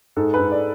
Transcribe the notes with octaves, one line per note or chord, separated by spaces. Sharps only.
G#2 A4
B4
G#2
D5